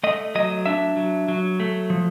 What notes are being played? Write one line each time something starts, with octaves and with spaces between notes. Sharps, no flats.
A3 D#5
F#3 D#5
D4 E5
F#3
F#3
A3
F3